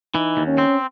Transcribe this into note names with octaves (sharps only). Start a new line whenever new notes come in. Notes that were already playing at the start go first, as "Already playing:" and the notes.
E3 D#4
D#2
C#4
C4